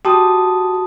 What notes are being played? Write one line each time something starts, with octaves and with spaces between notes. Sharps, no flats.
F#4 G4 A5 D#6